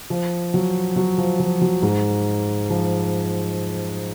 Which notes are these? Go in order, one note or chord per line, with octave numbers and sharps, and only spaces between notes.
F3
F#3
F#3
F3
F3
F#3
G#2 G#3
F3